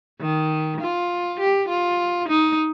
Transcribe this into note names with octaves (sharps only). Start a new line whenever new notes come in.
D#3
F4
G4
F4
D#4